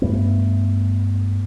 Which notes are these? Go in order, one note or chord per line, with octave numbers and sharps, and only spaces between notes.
G2 A3 B3